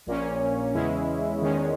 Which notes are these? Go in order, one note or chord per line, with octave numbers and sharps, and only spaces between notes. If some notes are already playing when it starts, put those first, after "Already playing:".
A#1 A#2 A#3 C#4
E2 C#3 G#3 C#4 E4
E2 D#3 G#3 C#4